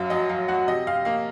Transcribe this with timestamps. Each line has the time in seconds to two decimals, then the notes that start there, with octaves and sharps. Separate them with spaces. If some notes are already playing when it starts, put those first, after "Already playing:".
Already playing: F#2 F#3 F5
0.10 F#3 D#5
0.29 F#3 F5
0.48 F#3 F#4 F#5
0.68 C3 D#5
0.86 C3 F5
1.05 A#3 F5